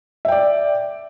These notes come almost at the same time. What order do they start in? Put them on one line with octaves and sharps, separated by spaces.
E5 G5 D5